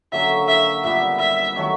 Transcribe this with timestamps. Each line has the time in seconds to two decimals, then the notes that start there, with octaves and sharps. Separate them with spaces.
0.12 D3 F#3 A#3 C#4 E5
0.48 E5
0.84 A#2 G3 B3 E5
1.19 E5
1.56 D#3 F#3 A3